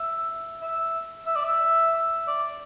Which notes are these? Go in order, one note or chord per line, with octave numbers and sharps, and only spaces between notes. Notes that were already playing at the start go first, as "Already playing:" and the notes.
Already playing: E5
E5
E5
D5
E5
D5